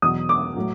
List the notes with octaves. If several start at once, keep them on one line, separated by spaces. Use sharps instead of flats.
E2 B2 F#3 D#6
D6
A2 F#3